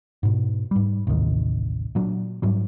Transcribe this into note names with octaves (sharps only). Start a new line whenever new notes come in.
G#2 B2
G#2 G3
A1 D#2 C3 D#3
A#2 F#3 D4
G#2 F#3 G3